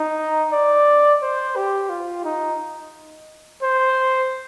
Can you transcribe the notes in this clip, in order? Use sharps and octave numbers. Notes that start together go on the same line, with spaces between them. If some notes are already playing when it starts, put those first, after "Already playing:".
Already playing: D#4
D5
C5
G4
F4
D#4
C5